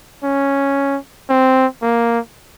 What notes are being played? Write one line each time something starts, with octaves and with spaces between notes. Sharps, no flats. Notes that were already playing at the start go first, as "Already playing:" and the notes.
C#4
C4
A#3